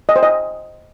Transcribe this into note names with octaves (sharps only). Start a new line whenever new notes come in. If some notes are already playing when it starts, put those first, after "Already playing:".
D#5
C5
D#5